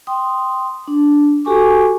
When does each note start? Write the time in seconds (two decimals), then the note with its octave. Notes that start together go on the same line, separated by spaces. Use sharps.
0.07 G5 C6 D#6
0.87 D4
1.45 F#4 G4 A4 G#5 C#6 D6